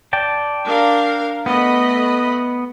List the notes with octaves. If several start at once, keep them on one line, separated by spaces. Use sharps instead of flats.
D5 G5 A5
D4 A#4 F5
A3 B3 D#5 B5